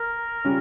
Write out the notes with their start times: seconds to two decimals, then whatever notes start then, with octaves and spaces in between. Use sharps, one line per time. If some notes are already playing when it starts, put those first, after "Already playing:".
Already playing: A#4
0.44 C#3 G3 C#4 F4